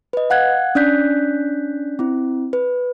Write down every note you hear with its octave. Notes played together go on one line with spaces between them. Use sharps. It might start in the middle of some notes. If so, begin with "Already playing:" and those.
B4 D#5
F5 F#5 F#6 G#6
C#4 D4 D5 F#6 G6 B6
C4 E4
B4